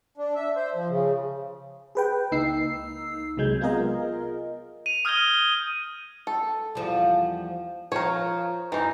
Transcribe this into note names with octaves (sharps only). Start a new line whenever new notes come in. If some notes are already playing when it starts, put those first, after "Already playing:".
D4
E5
C5
F3
C#3
G#4 B4 G5
C#2 A#3 D#4 E6 C7
C2 C3 F#3 G#3 G6 G#6
B3 F4 G#4 A#4 D#5
D#7 F7
D#6 F6 G6 G#6 A#6 G7
D#6
A4
E2 F3 G3
F3 A#4 C#5
F#2 E3 D#4